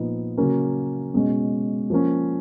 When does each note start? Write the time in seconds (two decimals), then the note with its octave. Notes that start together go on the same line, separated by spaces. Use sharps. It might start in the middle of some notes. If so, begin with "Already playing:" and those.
Already playing: A#2 F3 B3 D#4
0.37 C#3 F#3 A#3 C#4
1.14 B2 G#3 C#4
1.90 F3 A#3 C#4